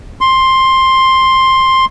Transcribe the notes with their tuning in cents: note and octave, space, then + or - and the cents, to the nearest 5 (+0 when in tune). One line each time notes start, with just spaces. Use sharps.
C6 +10